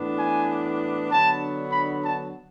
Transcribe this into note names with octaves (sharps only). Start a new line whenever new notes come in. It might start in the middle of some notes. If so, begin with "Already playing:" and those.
Already playing: A2 E3 B3 D4
G#5
D3 F#3 B3 D4 A5
B5
A5